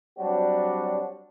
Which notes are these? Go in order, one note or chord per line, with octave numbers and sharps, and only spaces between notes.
F#3 G3 C4 D4 F#4